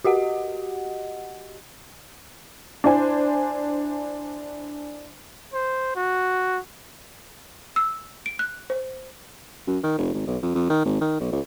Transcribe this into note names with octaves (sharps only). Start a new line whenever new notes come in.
F#4 G4 D#5 F#5
D4 E4 C5 G#5
C5
F#4
E6
D7
F#6
C5
F#2
D#3
F1
G#1
B1
F2
F2
D#3
G#1
D#3
B1
C#2